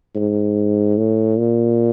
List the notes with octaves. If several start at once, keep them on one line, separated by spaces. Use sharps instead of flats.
G#2
A2
A#2